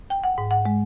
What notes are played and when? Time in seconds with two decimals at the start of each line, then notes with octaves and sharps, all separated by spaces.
0.10 G5
0.24 F#5
0.38 G#2
0.51 F#5
0.65 G#3